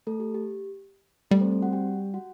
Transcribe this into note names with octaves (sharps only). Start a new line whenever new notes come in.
A3 A4
G4
G4
G3 A3 A4
C4 C5
C4 C5
F#4 F#5
G4 G5
F#4 F#5